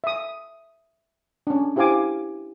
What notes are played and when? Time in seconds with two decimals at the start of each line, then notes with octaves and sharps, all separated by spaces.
0.04 E5 D#6
1.47 C#4 D4
1.76 E4 G4 C5 F5 G#5 D6